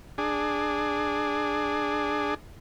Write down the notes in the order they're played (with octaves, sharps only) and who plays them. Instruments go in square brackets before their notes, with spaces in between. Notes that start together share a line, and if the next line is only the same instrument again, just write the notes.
[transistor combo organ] D4 G#4